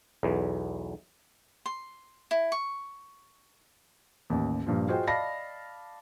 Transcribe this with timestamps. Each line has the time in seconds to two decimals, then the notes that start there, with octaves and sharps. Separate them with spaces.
0.23 B1 E2
1.66 C6
2.31 E4
2.52 C#6
4.30 A1 D#2
4.67 G2 A#2 F3
4.88 F4 F#4 G#4 C5 D#5 G5
5.07 D5 D#5 F5 A5 B5 A#6